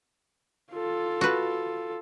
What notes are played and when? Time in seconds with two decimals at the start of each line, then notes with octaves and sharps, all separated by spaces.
0.72 F4 A4
1.21 F#4 B4